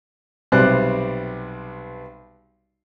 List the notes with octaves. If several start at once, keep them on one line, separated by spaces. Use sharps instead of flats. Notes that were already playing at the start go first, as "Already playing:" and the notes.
B1 C3 G3 C5 D5 F#6